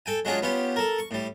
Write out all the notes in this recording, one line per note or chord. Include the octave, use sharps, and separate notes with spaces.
A4 G5 G#5
F#3 G#3 C#4 D4 F4 G#4
B3 C#4 F4 G4
A4 A#4
C#6
A2 G3